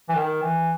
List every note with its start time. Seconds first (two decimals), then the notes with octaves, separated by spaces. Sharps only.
0.09 E3
0.15 D#3
0.43 E3